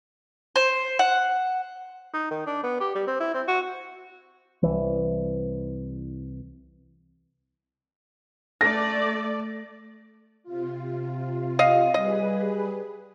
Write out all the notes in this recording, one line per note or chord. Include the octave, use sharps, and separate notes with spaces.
C5
F#5
D#4
D#3
D4
B3
G4
G3
C4
E4
C4
F#4
C2 E3
A3 D5 A#6
C3 F4
D#5 F5
G3 G#4 B4 D#5